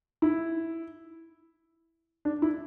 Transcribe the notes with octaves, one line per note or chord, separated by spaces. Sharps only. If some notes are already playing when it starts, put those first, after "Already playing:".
E4
D4
E4